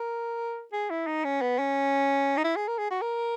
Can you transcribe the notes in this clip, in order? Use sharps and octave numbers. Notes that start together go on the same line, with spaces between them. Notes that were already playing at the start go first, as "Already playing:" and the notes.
Already playing: A#4
G#4
E4
D#4
C#4
B3
C#4
D#4
E4
G#4
A#4
G#4
F#4
A#4